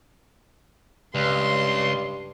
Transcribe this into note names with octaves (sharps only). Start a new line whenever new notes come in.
C#2 G2 C6